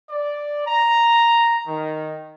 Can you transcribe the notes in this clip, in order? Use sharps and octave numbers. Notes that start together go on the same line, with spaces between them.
D5
A#5
D#3